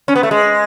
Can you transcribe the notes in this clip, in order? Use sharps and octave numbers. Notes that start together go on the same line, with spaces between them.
C#4
B3
A3
G#3